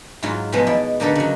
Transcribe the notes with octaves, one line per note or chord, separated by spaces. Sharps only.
G#2 F#3 E4 F4
B2 F3 F#3 G#3 B3
B2 E4 D5
D3 A#3 D#4 A4 B4
C#3 F#3